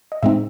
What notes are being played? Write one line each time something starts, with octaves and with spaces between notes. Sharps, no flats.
D#5
A2 G#3 C4 D#4 E5